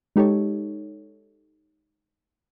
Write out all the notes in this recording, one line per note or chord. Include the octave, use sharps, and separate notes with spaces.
G#3 D#4 G4 A4 C#5